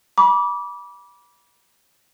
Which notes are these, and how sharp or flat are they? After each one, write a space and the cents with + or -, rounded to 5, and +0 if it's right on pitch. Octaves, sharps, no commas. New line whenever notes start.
B5 -30 D6 -15